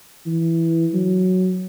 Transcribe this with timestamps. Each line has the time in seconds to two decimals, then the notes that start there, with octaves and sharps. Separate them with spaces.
0.26 E3
0.93 F#3